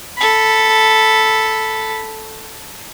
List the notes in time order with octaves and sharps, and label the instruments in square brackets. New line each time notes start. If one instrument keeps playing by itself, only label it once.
[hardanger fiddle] A4 B5